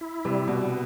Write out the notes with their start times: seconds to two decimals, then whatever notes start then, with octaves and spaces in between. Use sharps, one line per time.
0.01 E4
0.25 C3 G3
0.48 B2 B3